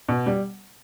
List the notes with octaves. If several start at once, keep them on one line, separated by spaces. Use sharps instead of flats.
B2
G3